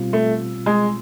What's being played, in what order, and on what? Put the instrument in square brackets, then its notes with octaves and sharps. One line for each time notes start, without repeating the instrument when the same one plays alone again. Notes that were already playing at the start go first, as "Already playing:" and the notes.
Already playing: [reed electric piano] B2 G3 C4 F4
[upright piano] A3
G#3